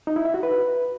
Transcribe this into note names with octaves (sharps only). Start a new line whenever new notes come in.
D#4
E4
E5
F#4
B4